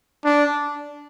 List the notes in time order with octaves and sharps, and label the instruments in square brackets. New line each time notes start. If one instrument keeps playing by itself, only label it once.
[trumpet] D4